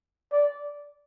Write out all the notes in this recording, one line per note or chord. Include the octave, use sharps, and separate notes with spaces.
D5